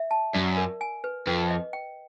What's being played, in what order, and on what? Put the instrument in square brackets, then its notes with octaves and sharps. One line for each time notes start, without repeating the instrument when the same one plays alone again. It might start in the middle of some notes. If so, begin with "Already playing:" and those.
Already playing: [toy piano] E5
A5
[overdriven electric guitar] F#2 [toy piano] D5
[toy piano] A#4
G#5
B4
[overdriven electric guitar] F2 [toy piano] B4
[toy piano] D#5
G5